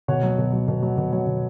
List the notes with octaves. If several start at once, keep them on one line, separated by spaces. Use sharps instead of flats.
B2 C#5 F#5
F#3
B2
F#3
B2
F#3
B2
F#3
B2